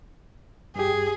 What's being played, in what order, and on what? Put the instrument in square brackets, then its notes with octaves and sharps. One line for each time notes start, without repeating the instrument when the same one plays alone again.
[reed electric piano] G2 G4 [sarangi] G#4